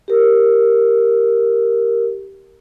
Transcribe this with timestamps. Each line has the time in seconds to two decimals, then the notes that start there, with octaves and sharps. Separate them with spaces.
0.08 G4 A#4